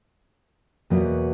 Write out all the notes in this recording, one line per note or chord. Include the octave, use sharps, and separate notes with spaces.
E2 B2 F#3 A#3